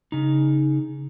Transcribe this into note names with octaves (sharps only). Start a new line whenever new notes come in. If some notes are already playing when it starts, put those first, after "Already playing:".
C#3 D#4